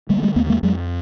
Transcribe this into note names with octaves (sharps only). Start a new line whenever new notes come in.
D3 G3 A3
A#3
G3 A3
D#2 A3 B3
G#3 A#3
F2 F#3 G#3